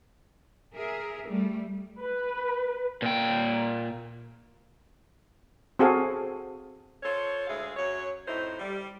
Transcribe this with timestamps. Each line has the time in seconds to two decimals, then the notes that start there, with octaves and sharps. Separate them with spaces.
0.74 G#4 A#4 E5
1.27 G3 A3
2.00 B4
3.02 A#2 G5
5.79 C4 F#4 G#4 A4 F5
7.02 F4 A4 C5 C#5
7.47 D2 G#3 G#4 E5 F5
7.77 F#2 F#3 C#5
8.27 F2 A2 D#4 E4 C5
8.59 G3